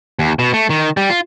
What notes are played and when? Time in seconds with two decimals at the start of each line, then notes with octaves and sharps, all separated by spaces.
0.19 D#2
0.39 B2
0.54 A3
0.70 D#3
0.97 G3
1.10 F4